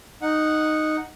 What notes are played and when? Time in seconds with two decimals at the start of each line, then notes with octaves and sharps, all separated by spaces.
0.22 D#4 F#5